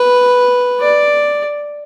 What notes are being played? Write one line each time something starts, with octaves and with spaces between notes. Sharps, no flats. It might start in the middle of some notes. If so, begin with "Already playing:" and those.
Already playing: B4
D5